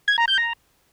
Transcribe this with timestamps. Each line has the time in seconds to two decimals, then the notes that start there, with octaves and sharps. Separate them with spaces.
0.08 G#6
0.18 A#5
0.28 G6
0.38 A#5